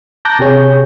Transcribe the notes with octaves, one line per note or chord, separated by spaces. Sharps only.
A5 A#5 D6 F#6 G6 A#6
C3 G4 G#4 C#5 G6